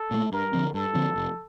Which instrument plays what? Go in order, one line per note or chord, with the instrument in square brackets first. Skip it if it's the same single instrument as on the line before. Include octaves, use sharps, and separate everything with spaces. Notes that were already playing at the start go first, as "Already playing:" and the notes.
Already playing: [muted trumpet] A4
[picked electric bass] A#2 A3
[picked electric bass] G2 [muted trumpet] A#4
[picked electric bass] D3 F3 C4
[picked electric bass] G2 [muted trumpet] A4
[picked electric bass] D3 F3 C4
F1